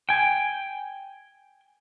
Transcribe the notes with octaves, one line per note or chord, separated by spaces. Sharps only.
G5 G#5